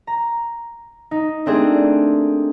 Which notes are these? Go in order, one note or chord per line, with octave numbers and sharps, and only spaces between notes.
A#5
D#4
A3 A#3 C4 D4 G4 G#4